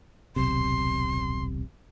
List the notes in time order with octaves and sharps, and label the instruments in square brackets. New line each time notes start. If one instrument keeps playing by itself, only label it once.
[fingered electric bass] D#1 B1 C3 [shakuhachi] C6